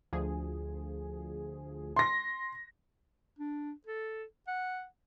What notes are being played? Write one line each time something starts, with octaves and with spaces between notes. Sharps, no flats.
D2 F3 G#4
C6 A#6
D4
A4
F#5